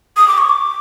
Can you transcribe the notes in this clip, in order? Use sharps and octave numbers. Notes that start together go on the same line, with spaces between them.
D#6
D6
C#6
D6